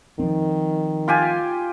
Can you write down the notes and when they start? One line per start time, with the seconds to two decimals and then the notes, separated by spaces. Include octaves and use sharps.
0.19 D#3 F3 C4
1.08 F4 G4 G#5